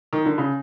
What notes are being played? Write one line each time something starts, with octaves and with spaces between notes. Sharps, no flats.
D#3
D3
C#3